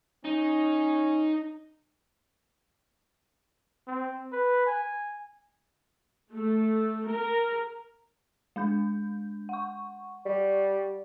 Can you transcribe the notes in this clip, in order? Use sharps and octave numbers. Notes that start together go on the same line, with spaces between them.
C#4 D#4
C4
B4
G#5
A3
A#4
G#3 D4 G6
F#5 C#6
G3